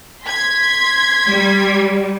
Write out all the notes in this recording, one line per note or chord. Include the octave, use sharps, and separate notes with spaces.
C6 G#6 B6
G3